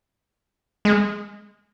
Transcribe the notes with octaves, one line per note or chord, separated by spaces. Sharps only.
G#3